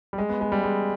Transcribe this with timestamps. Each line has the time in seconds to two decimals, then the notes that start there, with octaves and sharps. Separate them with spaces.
0.13 G3
0.18 G#3
0.29 B3
0.41 G#3
0.52 G3
0.63 G#3